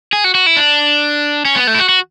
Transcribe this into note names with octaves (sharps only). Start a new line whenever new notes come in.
G#4
F#4
F#4
E4
D4
C#4
B3
A3
E4
F#4
F#4